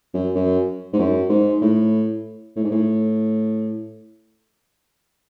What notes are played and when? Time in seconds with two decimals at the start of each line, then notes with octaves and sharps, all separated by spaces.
0.14 F#2
0.36 F#2
0.93 G#2
0.99 F#2
1.30 G#2
1.62 A2
2.56 A2
2.64 G#2
2.72 A2